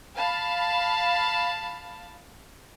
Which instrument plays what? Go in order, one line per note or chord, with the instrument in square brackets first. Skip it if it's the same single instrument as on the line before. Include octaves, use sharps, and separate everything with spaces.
[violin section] F5 A5 B5